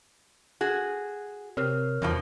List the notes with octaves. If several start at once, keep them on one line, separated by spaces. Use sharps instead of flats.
F#4 G#4
C3 A#4 C#5 F6
E2 G2 B2 F3